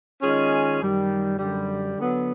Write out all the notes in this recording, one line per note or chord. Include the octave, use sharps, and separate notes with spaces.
D#3 G#3 C#4 F4 G#4
F#2 D#3 G3
F#2 D3 G3
D3 F#3 B3